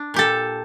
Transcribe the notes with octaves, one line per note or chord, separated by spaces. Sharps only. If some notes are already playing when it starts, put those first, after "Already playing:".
Already playing: D4
A#2 G4 A4